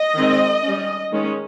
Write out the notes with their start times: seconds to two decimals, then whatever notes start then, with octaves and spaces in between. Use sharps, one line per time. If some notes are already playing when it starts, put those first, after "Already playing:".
Already playing: D#5
0.15 D#3 G#3 C4
0.62 C#4
0.67 G3
1.10 D#3 G#3 C#4